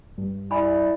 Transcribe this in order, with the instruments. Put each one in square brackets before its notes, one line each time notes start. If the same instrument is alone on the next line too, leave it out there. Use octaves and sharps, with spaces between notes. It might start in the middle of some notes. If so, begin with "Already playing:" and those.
[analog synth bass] G2
[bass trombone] E4 [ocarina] D5 [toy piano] G#5 B5